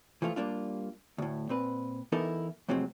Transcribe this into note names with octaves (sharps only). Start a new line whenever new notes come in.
E3 F3 A3 F4
G3 A#3 D4 F4
D2 A2
A#2 C4 B4
E3 B3 D#4 E4 A4 A#4
F2 A2 C3 F#3 G#3 C4